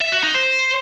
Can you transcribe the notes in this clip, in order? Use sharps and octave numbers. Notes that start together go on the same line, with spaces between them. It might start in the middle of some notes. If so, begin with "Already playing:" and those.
E5
F#4
D#4
C5